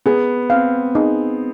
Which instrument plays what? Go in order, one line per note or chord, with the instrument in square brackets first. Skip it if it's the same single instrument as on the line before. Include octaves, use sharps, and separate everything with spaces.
[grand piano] B3 [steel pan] G#4
[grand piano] C4 [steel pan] F5
[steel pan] D#4 [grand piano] G#4